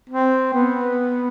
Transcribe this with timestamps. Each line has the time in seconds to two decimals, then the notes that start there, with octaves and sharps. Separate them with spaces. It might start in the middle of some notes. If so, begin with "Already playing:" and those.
0.09 C4
0.53 B3